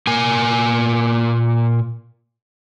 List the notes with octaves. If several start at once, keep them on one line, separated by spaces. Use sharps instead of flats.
A#2 A#3 G#5